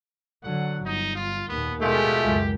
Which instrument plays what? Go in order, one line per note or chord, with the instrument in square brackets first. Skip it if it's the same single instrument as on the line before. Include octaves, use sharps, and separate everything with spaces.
[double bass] D3 F#3 [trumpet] F#5
[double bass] G1 [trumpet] D#4
[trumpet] F4
[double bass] D#2 A#2 [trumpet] B3
[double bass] B2 [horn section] G#3 A3 F4 [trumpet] G4
[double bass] C#2 F#2